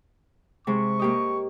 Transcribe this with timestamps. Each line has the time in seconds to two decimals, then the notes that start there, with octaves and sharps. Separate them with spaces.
0.67 C3 G#3 C#6
0.99 A#3 G4 D#5